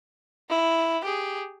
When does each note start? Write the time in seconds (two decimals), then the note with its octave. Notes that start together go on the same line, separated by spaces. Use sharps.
0.49 E4
1.04 G4 G#4